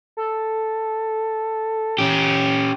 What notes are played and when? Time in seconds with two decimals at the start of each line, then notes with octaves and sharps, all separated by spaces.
0.17 A4
1.99 C#4 G4